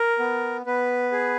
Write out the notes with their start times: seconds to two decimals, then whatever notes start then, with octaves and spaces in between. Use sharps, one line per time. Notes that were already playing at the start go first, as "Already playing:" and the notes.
Already playing: A#4
0.19 B3
0.66 B3 B4
1.12 G#4